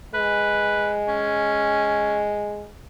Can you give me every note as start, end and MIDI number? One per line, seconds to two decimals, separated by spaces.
0.14 2.70 56
0.14 0.92 71
1.08 2.21 61